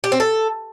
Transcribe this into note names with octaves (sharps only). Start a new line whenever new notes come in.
G4
C4
A4